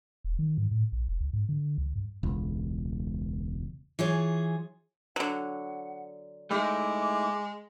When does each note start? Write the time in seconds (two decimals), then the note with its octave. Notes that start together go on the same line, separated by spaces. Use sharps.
0.24 E1
0.39 D#3
0.58 G#2
0.71 A2
0.92 A#1
1.08 F1
1.20 C#2
1.33 G#2
1.49 D3
1.78 C#2
1.96 G2
2.23 E1 C#2
3.99 E3 F4 G#4 C#5
5.16 D3 F#3 F#5
6.51 G#3 A3 D#4 E4 D6